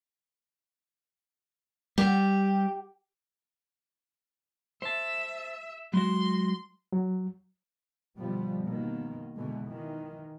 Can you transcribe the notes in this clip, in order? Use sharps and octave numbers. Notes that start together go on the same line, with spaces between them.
G3 G4
C5 E5 A5
F#3 G#3 F#4 C6
F#3
B2 D3 F3 G3 B3
B2 D#3 A#3
B2 D3 E3 G#3
D#3 E3